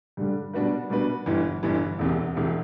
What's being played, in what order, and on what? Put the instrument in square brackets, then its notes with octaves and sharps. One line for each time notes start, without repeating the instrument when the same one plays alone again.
[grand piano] G2 D3 G3
B2 G3 D4 F#4 B4
B2 G3 D4 F#4 B4
G1 G2 E3
G1 G2 E3
E1 E2 C3
E1 E2 C3